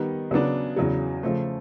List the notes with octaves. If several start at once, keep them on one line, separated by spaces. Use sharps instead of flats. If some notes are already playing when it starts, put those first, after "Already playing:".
Already playing: D#3 G3 B3
C#3 F#3 B3 D4
E2 C#3 F#3
C#3 F3 A3